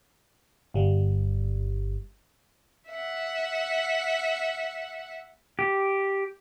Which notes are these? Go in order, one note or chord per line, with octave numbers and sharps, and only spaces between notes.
G1 G3
E5 F#5
G4